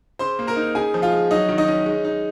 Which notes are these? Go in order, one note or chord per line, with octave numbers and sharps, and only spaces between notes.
C#3 C5 C6
A#3
A#4 A#5
D#4
C#3 G#4 G#5
F3
F4 F5
G#3
F#3 D#4 D#5
D#3
D#4 D#5
C#4
G#3
D#4